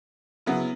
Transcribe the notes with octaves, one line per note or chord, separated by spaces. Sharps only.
C#3 F#3 B3 E4